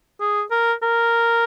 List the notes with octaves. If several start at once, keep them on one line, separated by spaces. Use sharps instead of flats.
G#4
A#4
A#4